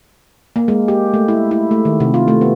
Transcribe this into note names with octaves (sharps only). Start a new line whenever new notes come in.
A#3
G#3
G4
A3
E4
E4
A3
D#3
C3
F4
A3
B3